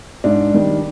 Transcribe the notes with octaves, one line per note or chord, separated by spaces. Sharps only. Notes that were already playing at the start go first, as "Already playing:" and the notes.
G#2 D4
D#3 G3